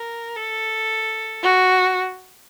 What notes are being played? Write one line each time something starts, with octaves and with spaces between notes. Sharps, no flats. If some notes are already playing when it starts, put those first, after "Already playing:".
Already playing: A#4
A4
F#4